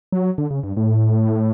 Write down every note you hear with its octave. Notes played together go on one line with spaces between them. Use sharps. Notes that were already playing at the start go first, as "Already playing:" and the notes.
F#3
D3
C#3
G2
A2